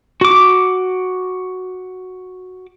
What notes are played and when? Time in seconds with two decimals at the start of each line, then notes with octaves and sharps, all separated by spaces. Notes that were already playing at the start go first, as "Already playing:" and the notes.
0.21 F#4 D6